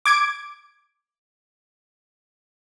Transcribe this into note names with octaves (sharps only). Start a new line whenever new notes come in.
D6 G#6 D7